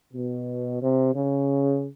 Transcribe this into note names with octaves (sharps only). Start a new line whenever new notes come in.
B2
C3
C#3